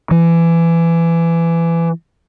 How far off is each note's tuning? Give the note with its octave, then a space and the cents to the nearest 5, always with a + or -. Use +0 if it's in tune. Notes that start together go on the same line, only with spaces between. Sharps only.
E3 +25